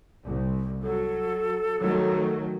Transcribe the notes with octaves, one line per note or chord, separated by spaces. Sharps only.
C2
F#3 A4
D#3 F#3 A3